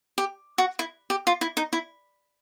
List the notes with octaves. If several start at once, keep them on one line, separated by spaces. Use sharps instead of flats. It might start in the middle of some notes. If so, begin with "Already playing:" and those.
G4
F#4
E4
G4
F4
E4
D#4
E4